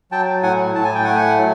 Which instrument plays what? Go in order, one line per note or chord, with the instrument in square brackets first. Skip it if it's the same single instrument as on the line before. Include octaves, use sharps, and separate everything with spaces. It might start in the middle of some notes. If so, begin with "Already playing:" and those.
[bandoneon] F#3 G5 A5
A2 F#5 G#5
A2 A5
G#5
G5
A3 F#5 G#5
F#3